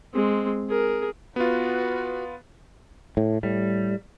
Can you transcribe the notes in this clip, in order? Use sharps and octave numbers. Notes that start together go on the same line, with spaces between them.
G#3 C4
G#4 A#4
B3 F4 F#4 B4
A2
A2 G3